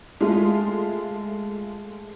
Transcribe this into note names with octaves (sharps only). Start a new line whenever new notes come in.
G#3 A3 F4